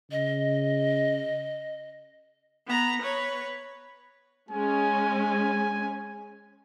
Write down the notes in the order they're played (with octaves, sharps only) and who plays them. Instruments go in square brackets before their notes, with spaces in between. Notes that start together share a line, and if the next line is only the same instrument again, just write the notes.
[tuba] C#3 [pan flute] D#5
[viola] B3 A#5
B4 C#5
[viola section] G#3 C#4 [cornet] G#5